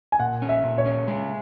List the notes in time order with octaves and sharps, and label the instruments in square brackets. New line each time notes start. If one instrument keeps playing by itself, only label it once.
[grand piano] G#5
[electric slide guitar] A#2 [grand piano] F#5
[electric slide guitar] C#4
[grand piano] E5
[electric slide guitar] A#2
[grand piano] C#5
[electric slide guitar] C#4
G#3